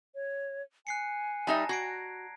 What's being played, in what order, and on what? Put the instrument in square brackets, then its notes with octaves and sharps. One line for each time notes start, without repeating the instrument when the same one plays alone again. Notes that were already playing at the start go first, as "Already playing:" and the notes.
[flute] C#5
[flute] G#5 [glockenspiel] F#6 C7 C#7
[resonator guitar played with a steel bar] G3 D#4 E5 [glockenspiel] A5 A#5 A#6
[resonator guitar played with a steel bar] F#4 [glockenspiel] G#6 C7 D7